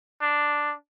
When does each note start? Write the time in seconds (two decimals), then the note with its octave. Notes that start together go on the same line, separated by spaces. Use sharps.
0.21 D4